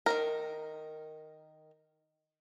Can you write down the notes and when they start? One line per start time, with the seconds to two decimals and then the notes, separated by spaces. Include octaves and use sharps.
0.06 D#3 E3 A#4